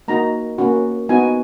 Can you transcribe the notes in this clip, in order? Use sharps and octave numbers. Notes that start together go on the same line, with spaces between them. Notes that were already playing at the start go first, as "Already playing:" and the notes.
A#3 D#4 F#4 A#5
A#3 C#4 F#4
B3 D#4 F#4 G#5